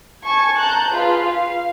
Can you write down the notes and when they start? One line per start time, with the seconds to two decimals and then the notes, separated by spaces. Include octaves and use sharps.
0.25 G#5 A5 C#6 G#6
0.58 A5 A#5 F#6 G6
0.91 F4 G#4 B4 F5
1.27 F5